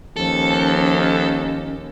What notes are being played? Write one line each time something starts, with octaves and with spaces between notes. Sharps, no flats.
D#2 F3 C#4 A4